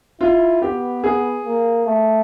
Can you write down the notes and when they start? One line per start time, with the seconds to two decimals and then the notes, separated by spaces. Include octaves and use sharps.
0.20 E4 F4
0.61 B3 G4
1.04 G#4
1.44 A#3
1.86 A3